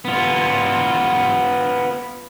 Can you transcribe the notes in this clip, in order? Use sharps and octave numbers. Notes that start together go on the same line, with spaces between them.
B3 F4